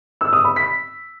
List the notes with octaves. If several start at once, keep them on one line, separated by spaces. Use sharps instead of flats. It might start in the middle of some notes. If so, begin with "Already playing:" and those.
E6
D#6
B5
B6